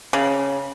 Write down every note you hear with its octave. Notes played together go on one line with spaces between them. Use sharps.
C#3